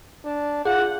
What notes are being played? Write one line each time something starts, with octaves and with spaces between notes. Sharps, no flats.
D4
F4 G#4 F#5